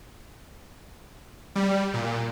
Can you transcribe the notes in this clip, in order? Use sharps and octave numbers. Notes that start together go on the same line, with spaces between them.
G3
A#2